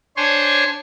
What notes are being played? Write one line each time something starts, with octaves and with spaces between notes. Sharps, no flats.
D4 C5 C#5 G#5 C6 C#6